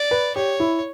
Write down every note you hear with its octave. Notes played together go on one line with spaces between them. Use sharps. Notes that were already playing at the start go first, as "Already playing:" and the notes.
Already playing: D5
B4
G4 C#5
E4